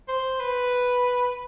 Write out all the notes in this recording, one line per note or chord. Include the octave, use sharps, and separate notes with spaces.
C5
B4